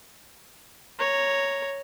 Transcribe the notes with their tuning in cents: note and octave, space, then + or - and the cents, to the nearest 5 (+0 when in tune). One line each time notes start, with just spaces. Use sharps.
C#5 +0 A#5 +0